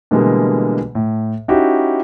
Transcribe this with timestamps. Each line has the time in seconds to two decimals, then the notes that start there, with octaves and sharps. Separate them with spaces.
0.11 B2 D3 E3 G3 G#3 A#3
0.95 A2
1.48 C#4 D#4 E4 F#4 G4